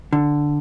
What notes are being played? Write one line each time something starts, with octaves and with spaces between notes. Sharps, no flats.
D3